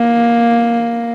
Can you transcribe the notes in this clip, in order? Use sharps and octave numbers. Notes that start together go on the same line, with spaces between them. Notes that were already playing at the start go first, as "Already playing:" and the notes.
Already playing: A#3